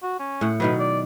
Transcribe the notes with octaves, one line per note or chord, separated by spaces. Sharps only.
F#4
C#4
A2 F#5
B2 D#3 F#3 B4
D5